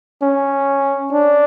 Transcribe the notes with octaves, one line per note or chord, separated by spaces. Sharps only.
C#4
D4